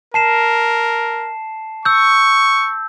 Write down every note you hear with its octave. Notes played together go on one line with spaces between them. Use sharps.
A#4 A5 C7 E7
C#6 E6 G6